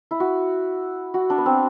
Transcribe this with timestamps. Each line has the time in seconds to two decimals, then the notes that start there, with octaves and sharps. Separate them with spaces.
0.11 E4
0.20 F#4
1.14 F#4
1.30 D4
1.38 B3
1.46 C4